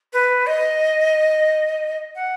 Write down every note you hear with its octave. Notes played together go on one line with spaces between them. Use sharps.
B4
D#5
F#5